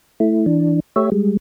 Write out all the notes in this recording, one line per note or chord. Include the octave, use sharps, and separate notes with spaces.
A3 E4
E3 D4
A3 G4 C#5 E5
G3 G#3